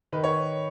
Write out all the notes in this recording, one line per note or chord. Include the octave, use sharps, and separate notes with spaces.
D#3 B4
C#5